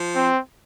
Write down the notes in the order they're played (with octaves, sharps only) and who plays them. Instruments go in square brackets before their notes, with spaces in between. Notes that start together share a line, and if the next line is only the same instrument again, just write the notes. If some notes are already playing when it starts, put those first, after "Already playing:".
Already playing: [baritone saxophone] F3
[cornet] C4